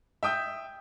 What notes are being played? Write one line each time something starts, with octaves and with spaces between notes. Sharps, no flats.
E5 G5 D#6 G6